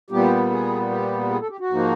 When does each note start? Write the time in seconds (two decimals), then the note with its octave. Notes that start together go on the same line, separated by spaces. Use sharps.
0.10 A#2 G3 B3 G4
0.51 G#4
0.90 G4
1.30 G#4
1.41 A4
1.50 G4
1.60 F#4
1.70 G#2 F3 A#3 D#4